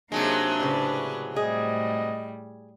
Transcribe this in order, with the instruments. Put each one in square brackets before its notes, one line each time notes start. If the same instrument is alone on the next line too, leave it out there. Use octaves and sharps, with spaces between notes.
[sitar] C3 F#3 G#3 [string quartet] A#3 D#4 G#4 [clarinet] D4
[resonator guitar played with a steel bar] A2 C#3 [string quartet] B4 D5
[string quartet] A2 G3 [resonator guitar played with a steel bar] G#4 [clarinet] D#5